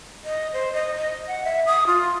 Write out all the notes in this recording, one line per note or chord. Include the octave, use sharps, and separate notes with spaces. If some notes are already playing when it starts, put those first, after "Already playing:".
D#5
C5
D#5
D#5
F#5
E5
D#6
F4